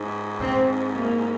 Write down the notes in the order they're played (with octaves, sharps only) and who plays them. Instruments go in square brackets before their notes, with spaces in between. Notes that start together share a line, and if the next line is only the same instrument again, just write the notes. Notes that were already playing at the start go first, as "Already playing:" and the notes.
Already playing: [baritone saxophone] G#2
[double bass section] C4
A#3